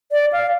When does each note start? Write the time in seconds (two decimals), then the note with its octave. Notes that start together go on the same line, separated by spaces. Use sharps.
0.12 D5
0.32 F5